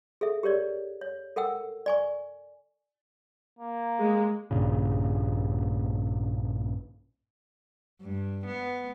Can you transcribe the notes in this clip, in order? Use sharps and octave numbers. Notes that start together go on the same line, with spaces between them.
G#4 A4 E5
G4 A#4 C#5 D5
C#5
A4 A#4 F#5 G5 E6
D5 G#5 C#6
A#3
G#3
A#1 G2 A#2 C#3
G2
B3